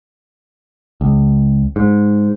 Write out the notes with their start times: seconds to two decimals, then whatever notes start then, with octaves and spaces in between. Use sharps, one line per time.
1.01 C#2
1.76 G#2